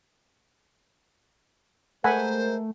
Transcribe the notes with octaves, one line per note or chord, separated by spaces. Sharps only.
G#3 A3 A#4 C5 F#5 G#5 B5